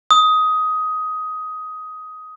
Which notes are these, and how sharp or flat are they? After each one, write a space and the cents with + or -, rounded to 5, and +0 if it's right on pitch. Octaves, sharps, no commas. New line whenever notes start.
D#6 +15